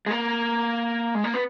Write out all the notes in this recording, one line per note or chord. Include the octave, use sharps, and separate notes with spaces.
G#3
A#3
G#3
A#3
B3